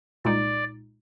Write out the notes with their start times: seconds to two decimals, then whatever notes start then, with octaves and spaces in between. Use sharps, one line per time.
0.25 C2 A#2 G#3 D#4 D5